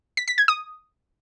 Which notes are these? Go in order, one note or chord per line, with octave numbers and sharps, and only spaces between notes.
B6
B6
G#6
D#6